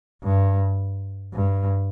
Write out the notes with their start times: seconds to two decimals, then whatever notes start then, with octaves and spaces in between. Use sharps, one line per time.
0.23 G2
1.33 G2